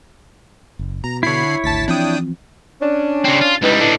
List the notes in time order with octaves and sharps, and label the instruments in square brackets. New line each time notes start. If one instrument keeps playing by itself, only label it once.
[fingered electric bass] F#1
[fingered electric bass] B2 [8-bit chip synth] A#5
[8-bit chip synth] D3 B5 C7 [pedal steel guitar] E4 C#5
[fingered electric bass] G#1 D2 [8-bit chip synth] A5 A6 B6
[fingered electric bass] E3 F3 C4 [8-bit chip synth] D4 G5 D#6
[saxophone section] C#4 D4
[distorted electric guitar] C#3 C4
F4
[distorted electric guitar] C#2 G3 [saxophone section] D#4 E4 B4
[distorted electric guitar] A2 D4